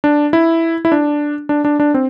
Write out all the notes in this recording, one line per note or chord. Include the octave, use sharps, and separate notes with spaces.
D4
E4
E4
D4
D4
D4
D4
C4